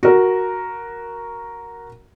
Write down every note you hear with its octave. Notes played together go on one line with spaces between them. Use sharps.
F#4 A#4